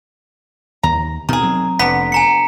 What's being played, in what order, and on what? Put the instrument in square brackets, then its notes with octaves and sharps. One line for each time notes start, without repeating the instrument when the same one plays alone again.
[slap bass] D#2 [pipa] A#5
[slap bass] B2 [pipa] D#3 G#4 [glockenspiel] A#5
[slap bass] F#3 C4
[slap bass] F1 [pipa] D3 B3 [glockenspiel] B6
[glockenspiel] G#5 A#5 C#7